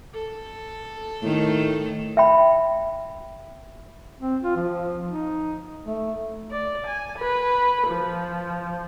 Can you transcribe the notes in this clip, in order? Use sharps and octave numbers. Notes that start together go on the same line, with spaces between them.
A4
A2 D#3 A3
E5 G5 B5
C4
F4
F3
D#4
A3
D5
G#5
B4
F3